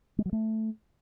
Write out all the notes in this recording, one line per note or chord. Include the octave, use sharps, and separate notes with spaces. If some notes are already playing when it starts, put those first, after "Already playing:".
G#3
F#3
A3